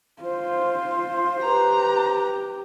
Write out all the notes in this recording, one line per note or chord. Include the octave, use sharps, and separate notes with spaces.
F4 C5
G4 B4 A#5